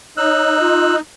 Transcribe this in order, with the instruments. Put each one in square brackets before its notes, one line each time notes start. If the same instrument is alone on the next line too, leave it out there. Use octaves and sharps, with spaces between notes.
[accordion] D#4 [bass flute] C#5 [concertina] E6 F#6
[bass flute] F4